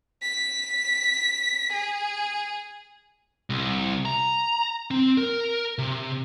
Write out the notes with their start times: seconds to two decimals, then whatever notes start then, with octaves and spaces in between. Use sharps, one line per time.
0.22 B6
1.72 G#4
3.50 C2
4.05 A#5
4.91 C4
5.18 A#4
5.78 C3